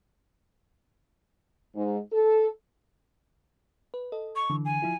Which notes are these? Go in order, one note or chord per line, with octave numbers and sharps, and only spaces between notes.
G#2
A4
B4
A4 D#5
C#6
D3 E3
G#5
F3 E4 F4